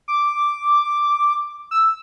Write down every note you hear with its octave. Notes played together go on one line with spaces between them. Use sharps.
D6
E6